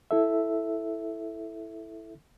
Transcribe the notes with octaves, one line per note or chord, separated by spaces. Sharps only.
E4 A4 E5